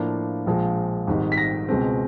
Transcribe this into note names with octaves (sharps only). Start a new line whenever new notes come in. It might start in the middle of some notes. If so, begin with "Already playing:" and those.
Already playing: A2 F3 A#3 D4
A#1 A#2 F3 G#3
G#1 G#2 D#3 G3
B6
A#6
C#2 B2 G#3 C4